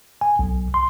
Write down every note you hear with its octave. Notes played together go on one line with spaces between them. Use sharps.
G#5
B1
C6